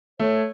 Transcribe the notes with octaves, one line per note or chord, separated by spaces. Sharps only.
A3 C#5